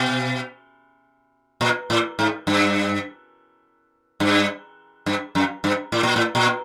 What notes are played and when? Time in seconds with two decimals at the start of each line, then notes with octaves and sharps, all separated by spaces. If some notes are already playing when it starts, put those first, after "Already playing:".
Already playing: B2
1.61 A#2
1.90 A2
2.19 G#2
2.47 G2
4.20 G2
5.06 G2
5.35 F#2
5.64 G2
5.92 A2
6.03 A#2
6.16 A2
6.35 A#2